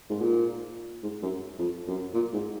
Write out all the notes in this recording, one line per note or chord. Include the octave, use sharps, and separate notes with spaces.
G#2
A#2
G#2
F#2
F2
F#2
A#2
G#2